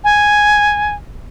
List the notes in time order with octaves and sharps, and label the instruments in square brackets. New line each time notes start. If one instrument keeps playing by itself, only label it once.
[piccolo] G#5